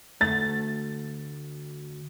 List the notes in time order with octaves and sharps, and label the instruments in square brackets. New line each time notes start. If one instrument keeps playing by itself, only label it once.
[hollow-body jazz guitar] D2 A3 [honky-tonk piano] A6